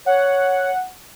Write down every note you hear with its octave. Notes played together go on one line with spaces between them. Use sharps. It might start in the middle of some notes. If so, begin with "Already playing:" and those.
C#5 F#5